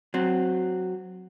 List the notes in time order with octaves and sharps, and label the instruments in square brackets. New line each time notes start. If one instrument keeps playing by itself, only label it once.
[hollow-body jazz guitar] F#3 C4